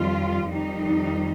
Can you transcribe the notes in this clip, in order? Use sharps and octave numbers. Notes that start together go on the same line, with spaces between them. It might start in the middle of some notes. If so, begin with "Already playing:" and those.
Already playing: F2 D#3 G3 F4
F2 D#3 G3 D#4